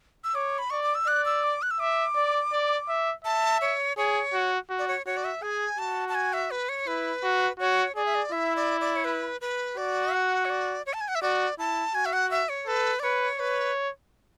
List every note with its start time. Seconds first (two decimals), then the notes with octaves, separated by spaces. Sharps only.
0.24 E6
0.35 C#5 D6
0.58 B5
0.70 D5 C#6
0.83 D6
0.95 E6
1.07 D5 F#6
1.26 E6
1.44 D6
1.62 F#6
1.71 E6
1.80 E5 D6
2.16 D5
2.52 D5
2.89 E5
3.25 E5 A5
3.61 C#5
3.97 G#4 C#5
4.33 F#4
4.70 F#4
4.79 D5
4.88 C#5
5.06 F#4 C#5
5.17 D5
5.24 E5
5.42 G#4 G#5
5.78 F#4 A5
6.09 A5
6.15 G#5
6.33 E5
6.51 B4
6.69 C#5
6.87 E4 B4
7.23 F#4
7.60 F#4 C#5
7.96 G#4 D5
8.06 E5
8.15 D5
8.32 E4 E5
8.56 D5
8.81 D5
8.96 C#5
9.04 B4
9.41 B4
9.77 F#4 D5
10.13 F#5
10.45 C#5
10.50 D5
10.86 C#5
10.93 A5
11.01 G#5
11.08 F#5
11.15 E5
11.22 F#4 D5
11.58 E4 A5
11.95 F#4 G#5
12.06 E5
12.13 F#5
12.31 E5
12.49 C#5
12.67 A4 B4
13.00 D5
13.03 B4 C#5
13.39 B4 C#5